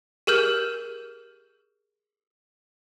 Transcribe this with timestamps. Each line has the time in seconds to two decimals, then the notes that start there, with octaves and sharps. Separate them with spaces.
0.27 G4 G#4 A#4 F6 G6